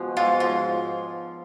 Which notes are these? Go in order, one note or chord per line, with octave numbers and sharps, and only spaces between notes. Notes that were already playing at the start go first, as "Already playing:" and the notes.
Already playing: B2 F3 G#3
G#2 F4
F3 F4